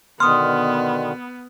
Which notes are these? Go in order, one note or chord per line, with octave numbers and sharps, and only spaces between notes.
B2 D3 D#3 B3 C6 D#6 F6